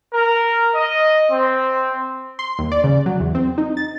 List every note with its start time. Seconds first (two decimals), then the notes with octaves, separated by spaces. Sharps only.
0.14 A#4
0.75 D#5
1.32 C4
2.39 C6
2.59 D#2
2.72 D5
2.84 C#3
3.06 F#3
3.20 E2
3.35 C4
3.58 D#4
3.77 A6